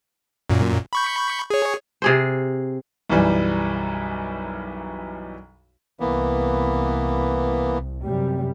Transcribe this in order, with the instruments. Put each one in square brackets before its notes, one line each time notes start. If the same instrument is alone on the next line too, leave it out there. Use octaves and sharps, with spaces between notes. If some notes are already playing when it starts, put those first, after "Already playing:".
[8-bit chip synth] F#2 A#2
B5 C#6 G6
G#4 C#5
[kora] C3 G#4 C5
[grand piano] B1 F#2 E3 G3
[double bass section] C2 [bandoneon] E3 A#3 B3
[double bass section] F#2 C3 G3